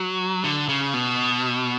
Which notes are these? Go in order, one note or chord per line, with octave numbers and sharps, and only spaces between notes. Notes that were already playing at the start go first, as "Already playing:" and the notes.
Already playing: F#3
D3
C#3
B2